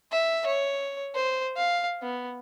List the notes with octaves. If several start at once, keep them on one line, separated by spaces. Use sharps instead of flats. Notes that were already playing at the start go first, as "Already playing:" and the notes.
E5
C#5
C5
F5
B3